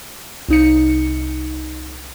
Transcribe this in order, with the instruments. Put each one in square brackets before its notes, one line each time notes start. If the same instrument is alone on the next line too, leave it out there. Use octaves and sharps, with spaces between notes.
[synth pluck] C2 D#4 C#7